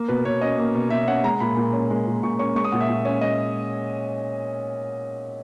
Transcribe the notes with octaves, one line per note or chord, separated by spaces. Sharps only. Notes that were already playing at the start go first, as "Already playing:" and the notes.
Already playing: A#3
B2 B4
B2 C#5
C#4 D#5
A#3
B2
B2 E5
C#4 F#5
G#3 A#5
A#2 B5
A#2
C#4
G#3
A#2
A#2 C#6
C#4 C#6
G#3 C#6
D#6
A#2 F#5
E5
A#2
C#4
G#3 D#5